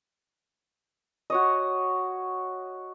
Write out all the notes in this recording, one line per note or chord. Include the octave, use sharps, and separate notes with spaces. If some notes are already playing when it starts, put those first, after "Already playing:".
F#4 C#5 D#5